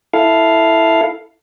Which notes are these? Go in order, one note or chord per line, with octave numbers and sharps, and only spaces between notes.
E4 A4 F5